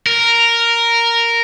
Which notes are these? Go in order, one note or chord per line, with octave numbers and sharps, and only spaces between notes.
A#4